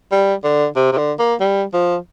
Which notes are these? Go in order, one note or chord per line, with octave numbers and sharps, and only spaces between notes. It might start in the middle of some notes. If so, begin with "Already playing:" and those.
G3
D3
C3
C3
D3
A#3
G3
F3